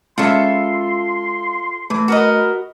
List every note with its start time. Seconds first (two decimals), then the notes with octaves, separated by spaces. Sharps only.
0.18 G#3 C#4 F4 A4 E5 B5 C6
1.90 E3 A3
2.08 F#4 A#4 B4 D#5